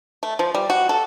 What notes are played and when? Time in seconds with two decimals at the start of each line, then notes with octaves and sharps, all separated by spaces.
0.23 A3
0.39 F3
0.54 G3
0.70 F#4
0.89 A4